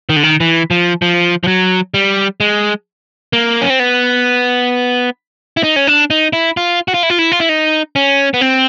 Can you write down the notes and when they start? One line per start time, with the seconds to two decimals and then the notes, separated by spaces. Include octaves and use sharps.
0.09 D#3
0.16 D3
0.24 D#3
0.40 E3
0.71 F3
1.02 F3
1.44 F3
1.47 F#3
1.94 G3
2.40 G#3
3.33 A#3
3.61 C#4
3.70 C4
3.80 B3
5.57 E4
5.63 D#4
5.76 C#4
5.87 D4
6.10 D#4
6.33 E4
6.57 F4
6.88 F#4
6.94 F4
7.03 E4
7.10 F4
7.19 E4
7.32 F4
7.40 E4
7.49 D#4
7.96 C#4
8.34 B3
8.41 C4